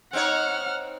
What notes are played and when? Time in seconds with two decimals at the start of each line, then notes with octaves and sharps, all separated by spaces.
0.13 C4 D#4 C#5 F#5 F6